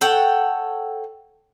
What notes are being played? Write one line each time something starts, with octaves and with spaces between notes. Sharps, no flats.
A4 C#5 F#5 G5